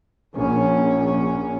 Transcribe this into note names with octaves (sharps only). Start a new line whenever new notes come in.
A#1 C#4